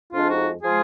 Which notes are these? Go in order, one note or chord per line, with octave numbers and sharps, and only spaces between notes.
F2 F3 G#3 D4 F4
D#4 F#4
F3 G#3 F4 G#4